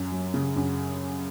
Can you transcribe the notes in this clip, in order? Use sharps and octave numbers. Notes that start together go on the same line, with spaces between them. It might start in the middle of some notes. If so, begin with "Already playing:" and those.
Already playing: F#2
F#3
C#3
F#2